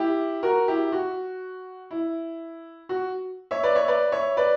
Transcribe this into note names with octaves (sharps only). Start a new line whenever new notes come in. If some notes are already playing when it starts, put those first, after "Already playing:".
Already playing: E4 G4
F#4 A#4
E4 G4
F#4
E4
F#4
C#5 E5
B4 D5
C#5 E5
B4 D5
C#5 E5
B4 D5